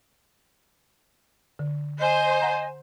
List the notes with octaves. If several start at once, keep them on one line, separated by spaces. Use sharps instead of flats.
D3
C5 D#5 G#5
F#5 A#5